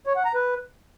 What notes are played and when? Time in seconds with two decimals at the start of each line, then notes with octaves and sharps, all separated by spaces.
0.06 C#5
0.16 F#5
0.25 A#5
0.34 B4